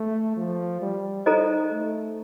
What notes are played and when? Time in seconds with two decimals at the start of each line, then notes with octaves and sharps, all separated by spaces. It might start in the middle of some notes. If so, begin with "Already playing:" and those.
Already playing: A3
0.37 F3
0.82 G3
1.26 D#4 A4 C5 D#5 A#5
1.71 A3